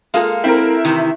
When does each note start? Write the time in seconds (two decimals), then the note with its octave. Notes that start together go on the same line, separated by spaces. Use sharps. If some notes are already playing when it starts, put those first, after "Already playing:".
0.14 G#3 A#3 F4 A4
0.44 C4 E4 A#4
0.85 C3 D#3 E3